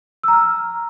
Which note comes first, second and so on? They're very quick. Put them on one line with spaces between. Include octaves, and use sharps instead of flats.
E6 A#5 F6